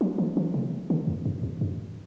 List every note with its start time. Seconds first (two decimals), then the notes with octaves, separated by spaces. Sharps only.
0.01 F#3
0.18 E3
0.37 E3
0.54 C3
0.90 D3
1.08 E2
1.25 F#2
1.43 E2
1.61 F#2